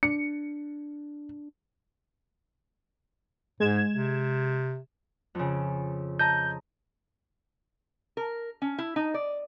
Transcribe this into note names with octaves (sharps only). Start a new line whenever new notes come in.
D4 C#7
G#2 G#3 G#6 E7
C3
F2 C#3
D#5 A5 A#5 G6
A#4
C#4
E4
D#4
D5